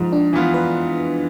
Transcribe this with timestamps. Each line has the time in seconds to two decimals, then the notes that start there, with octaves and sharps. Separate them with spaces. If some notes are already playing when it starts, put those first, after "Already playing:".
Already playing: G#2 F3
0.13 D4
0.33 E3 B3 F4
0.54 B4